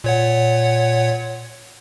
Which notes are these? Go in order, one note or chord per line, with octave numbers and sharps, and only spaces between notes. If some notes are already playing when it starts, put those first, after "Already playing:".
A#2 C#5 F#5